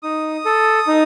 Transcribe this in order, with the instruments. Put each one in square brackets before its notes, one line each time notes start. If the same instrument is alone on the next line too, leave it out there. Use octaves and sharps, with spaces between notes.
[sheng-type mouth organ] D#4 D#6
A4
D#4